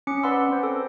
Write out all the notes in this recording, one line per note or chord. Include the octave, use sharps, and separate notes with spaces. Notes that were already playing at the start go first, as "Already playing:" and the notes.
C#4 D6 C#7
B4 D5 F#5 B5 C6 E6
C4 C5
A4